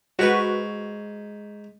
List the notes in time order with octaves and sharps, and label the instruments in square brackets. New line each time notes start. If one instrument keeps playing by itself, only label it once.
[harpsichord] G#2 C#6 [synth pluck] F#4 B4